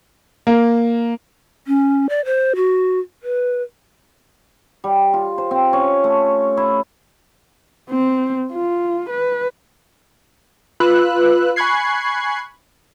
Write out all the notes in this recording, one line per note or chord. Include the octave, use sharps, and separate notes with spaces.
A#3
C#4
D5
C5
F#4
B4
G3
F4
C5
C4
C#4
A3
E4
C4
F4
B4
F4 B4 E6 F#6
G#5 B5 C#6 F#6 G#6 C7